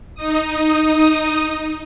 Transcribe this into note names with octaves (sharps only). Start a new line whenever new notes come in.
D#4 D#6